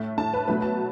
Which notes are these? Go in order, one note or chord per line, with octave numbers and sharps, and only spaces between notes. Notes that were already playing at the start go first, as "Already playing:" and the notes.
Already playing: A2 A3
A2 A3 A5
B4
B2 F#3 A3 B4
A5